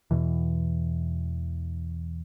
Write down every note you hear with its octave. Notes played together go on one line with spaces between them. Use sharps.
E2 B2 E3